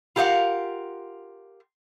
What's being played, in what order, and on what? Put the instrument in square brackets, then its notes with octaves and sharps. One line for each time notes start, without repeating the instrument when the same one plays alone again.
[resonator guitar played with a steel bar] F4 G4 A#4 D5 F5 F#5